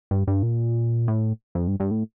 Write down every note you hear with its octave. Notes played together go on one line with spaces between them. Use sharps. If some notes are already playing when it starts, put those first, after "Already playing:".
G2
G2
A#2
A2
F2
G2
G2
A2